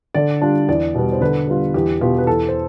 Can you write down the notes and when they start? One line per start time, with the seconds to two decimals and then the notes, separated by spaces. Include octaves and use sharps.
0.14 D3 D5
0.41 G3 D4 F4
0.68 E2 D5
0.94 B2 G3 B3
1.13 C5
1.21 D3 B4
1.47 G3 B3 F4
1.74 E2 G4
2.01 B2 B3 F4 G4
2.18 B4
2.27 E2 A4
2.48 C5